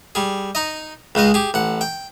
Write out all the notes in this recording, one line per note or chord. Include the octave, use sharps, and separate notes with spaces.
G3 G#4
D#4 D#5
C#2 C#3 G#3 D#5
G4 G#4
A1 F#5
G5